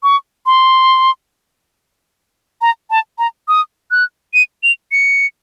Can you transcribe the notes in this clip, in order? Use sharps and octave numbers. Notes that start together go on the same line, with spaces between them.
C#6
C6
A#5
A5
A#5
D#6
F#6
D#7
F7
C#7